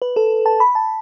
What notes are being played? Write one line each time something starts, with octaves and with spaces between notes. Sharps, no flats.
B4
A4
A5
B5
A5